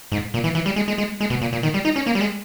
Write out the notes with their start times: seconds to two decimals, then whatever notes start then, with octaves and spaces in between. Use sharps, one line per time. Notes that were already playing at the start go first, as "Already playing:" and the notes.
0.12 G#2
0.34 A#2
0.44 E3
0.55 E3
0.66 G3
0.76 G#3
0.88 G#3
0.98 G#3
1.21 G#3
1.30 B2
1.41 A#2
1.53 A#2
1.63 D#3
1.74 G3
1.85 D#4
1.96 C#4
2.06 A#3
2.15 G3
2.21 G#3